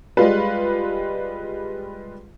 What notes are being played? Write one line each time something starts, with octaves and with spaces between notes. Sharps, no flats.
G3 G#3 F4 B4